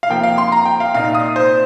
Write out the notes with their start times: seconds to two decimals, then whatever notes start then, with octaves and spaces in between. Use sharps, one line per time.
0.03 F5
0.10 F2 F3 A#3 G5
0.23 F5
0.38 C6
0.52 A#5
0.65 G5
0.80 F5
0.94 C2 A#2 A#3 D#4 F5
1.15 D#6
1.36 C5